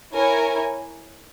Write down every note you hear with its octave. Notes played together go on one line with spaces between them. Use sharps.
E4 A#4 C#5 G#5